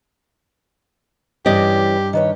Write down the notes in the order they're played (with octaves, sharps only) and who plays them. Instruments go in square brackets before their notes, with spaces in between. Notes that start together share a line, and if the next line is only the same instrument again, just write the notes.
[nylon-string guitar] G2 D5 D#5 [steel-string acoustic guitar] E3 C#4 [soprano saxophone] G4
[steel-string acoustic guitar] D#3 B4 C#5